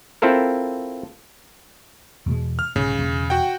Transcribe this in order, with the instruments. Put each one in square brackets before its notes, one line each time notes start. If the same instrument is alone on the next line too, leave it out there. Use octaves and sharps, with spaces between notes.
[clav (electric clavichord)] C4 E4 F4 A4 A#4
[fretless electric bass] E2 B2 G#3
[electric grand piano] F6
[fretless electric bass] B1 G#2 [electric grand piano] C#3
[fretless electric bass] E1
[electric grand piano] F#4 F#5 G5